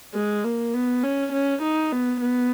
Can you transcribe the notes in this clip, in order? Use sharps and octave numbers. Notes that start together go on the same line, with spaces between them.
G#3
A#3
B3
C#4
C#4
D#4
B3
B3